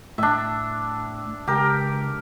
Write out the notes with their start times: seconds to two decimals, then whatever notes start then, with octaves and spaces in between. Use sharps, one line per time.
0.18 A2 D4 E5
1.47 C#2 G4 A#4